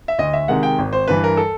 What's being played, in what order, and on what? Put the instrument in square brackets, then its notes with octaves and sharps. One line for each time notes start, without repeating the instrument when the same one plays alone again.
[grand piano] E5
D2 D#5
E5
C3 D#3 G#3 F#5
G5
G#1
C5
G2 E3 B4
A#4
A4